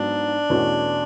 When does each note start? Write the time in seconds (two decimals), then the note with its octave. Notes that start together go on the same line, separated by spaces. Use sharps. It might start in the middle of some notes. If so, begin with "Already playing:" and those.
Already playing: G#2 F#3 B3 D4 F#4
0.50 E2 B2 A3 C#4 F#4